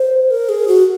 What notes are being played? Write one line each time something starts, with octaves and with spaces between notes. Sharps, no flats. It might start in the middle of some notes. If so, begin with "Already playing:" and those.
Already playing: C5
A#4
G#4
F#4